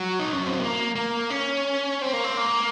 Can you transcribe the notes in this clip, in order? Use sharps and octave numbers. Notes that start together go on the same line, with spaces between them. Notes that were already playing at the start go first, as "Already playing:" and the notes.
Already playing: F#3
D#4
C#4
C4
A#3
A#3
C#4
C4
A#3
C4
A#3